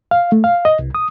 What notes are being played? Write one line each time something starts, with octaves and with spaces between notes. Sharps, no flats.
F5
A3
F5
D#5
C2
D#6